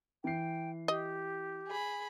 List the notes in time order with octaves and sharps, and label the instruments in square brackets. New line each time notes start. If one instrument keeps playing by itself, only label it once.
[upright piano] E3 C7 [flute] G5
[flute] G4 [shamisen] D#5
[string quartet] G#4 B5